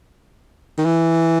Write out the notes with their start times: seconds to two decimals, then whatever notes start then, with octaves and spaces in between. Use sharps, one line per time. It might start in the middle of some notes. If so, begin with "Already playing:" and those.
0.78 D#3
0.85 E3